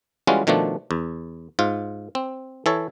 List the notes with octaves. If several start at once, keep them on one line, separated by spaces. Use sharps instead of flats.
E3 G3 G#3 C#4 F4 F#4
B2 D#3 F3 A3 D4
E2
G#2 F4
C4
E3 A4 C#5